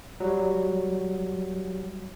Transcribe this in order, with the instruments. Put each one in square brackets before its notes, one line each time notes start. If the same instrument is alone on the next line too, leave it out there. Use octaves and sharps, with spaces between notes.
[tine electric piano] F#3 G3